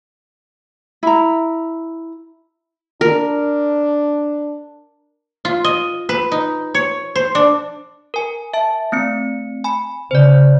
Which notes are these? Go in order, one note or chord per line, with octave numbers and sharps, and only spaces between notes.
E4 A#5
D4 A#4
F4
D#5
B4
D#4
C#5
C5
D4
A#4 G#5
E5 A5
A3 C4 C#7
G#5 B5
C#3 C5 D5